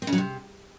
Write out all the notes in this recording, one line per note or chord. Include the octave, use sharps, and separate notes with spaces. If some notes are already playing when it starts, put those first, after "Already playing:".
C4
C#3
F#3
C3